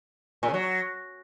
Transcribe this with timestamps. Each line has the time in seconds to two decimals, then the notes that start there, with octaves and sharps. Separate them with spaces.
0.43 A#2
0.48 C#3
0.54 F#3